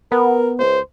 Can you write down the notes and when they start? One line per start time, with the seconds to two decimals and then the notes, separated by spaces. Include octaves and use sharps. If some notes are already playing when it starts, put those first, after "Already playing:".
0.12 B3 A#4
0.59 C#2 C5